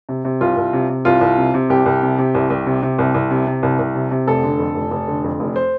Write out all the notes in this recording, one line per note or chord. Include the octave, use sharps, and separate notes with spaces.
C3
C3
C2 F4
C2
C3
C3
C2 F4
C2
C3
C3
C2 G4
C2
C3
C3
C2
C2
C3
C3
C2
C2
C3
C3
C2
C2
C3
C3
F1 A4
D3
F2
F1
F1
D3
F2
F1
C5